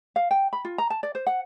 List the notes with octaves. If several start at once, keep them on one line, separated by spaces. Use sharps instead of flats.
F5
G5
B5
F4
A#5
A5
D5
C5
F#5